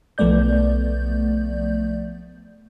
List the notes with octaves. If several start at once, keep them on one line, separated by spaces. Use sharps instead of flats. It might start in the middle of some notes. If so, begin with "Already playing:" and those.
B1 F3 A3 B3 D5 G6